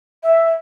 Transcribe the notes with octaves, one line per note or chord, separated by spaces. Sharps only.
E5